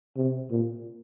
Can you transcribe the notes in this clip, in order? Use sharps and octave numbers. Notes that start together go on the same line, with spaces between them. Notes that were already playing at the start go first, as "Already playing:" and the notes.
C3
A#2